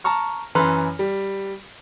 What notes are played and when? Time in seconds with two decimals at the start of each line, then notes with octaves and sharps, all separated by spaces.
0.04 A5 A#5 C#6 F6
0.55 F#2 E3 B4 A#5 C6 F6
0.99 G3